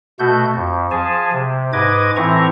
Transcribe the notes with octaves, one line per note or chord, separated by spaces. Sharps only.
B2 A3 F#4 G6
F2
F3 G#4 G#5 A5
C3
G#2 B4 D#5 D6 G#6
A2 E3 C4 E4 A#5 C#6